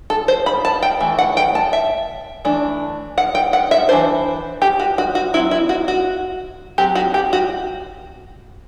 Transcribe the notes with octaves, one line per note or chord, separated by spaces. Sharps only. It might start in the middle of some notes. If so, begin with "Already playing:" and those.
A4
C5
B5
A5
G5
E3 A3
F#5
G5
A5
E5
E3 A3 D4
F#5
G5
F#5
E5
E3 A3 D4 C5
G4
F#4
F#4
F#4
F#3 C4 E4
E4
F#4
F#4
F#3 C4 G4
F#4
G4
F#4